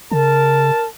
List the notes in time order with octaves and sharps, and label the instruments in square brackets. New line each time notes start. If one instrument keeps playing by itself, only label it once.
[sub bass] C#3 [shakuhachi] A#4 [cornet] A5